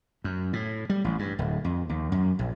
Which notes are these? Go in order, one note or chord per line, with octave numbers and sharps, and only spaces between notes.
F#2
A2
G3
A1
G2
D1
F2
D#2
F#2
A#1